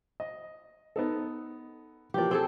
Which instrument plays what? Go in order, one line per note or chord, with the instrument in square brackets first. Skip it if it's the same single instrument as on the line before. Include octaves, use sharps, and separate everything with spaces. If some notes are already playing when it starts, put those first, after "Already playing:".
[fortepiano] D#5
B3 D#4 A4
[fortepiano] E3 F3 A#3 [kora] G4 D5
[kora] C4 G#4 A4 [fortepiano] G5